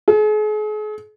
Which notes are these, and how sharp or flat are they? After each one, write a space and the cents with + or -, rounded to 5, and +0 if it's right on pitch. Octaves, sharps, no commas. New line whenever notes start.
G#4 +40